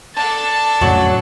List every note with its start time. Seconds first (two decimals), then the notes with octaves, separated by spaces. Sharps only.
0.15 D4 A4 A5
0.81 F2 A2 C#3 F#3